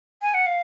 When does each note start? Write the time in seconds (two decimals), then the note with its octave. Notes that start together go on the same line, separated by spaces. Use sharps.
0.22 G#5
0.34 F#5
0.46 F5